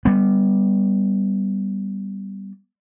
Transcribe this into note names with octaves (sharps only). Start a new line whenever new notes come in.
G3 B3